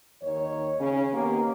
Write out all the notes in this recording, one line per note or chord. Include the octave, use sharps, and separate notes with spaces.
D#2 D#3 C#5
C#3 C#4
D#3 A#3 B3 C#4 G4